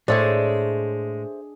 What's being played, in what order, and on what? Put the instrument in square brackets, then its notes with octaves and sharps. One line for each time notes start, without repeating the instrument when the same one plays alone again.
[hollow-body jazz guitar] A2 [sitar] G#3 [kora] D4 A4 C#5 [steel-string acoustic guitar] C5 E5